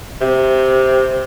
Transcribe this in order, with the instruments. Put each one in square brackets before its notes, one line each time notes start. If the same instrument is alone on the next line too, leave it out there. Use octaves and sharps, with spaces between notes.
[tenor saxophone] C3